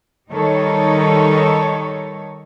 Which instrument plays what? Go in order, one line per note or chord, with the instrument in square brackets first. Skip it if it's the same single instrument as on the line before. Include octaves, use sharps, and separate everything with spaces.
[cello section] D#3 G3 D#4 A4 C#5